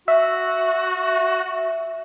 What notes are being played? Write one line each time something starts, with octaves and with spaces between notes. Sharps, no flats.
F#4 E5